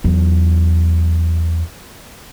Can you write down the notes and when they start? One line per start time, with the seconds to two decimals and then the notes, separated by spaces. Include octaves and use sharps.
0.04 E2 F#3